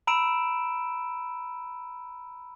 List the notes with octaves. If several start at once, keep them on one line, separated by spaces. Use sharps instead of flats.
A#5 B5 E6 D7 E7